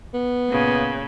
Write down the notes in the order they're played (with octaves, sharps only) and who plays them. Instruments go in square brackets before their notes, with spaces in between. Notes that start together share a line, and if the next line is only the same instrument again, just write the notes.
[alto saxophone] B3
[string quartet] A#2 C#3